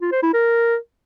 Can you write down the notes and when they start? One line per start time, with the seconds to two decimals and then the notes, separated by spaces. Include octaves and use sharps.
0.01 F4
0.12 C5
0.23 E4
0.34 A#4